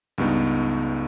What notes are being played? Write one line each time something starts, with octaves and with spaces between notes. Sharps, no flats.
C#2 G2 B3 D#4